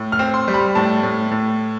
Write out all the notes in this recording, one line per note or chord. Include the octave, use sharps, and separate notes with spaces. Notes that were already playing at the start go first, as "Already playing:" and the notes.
Already playing: A2
F6
C4
C6
G3
B5
A2 A5
A2
A2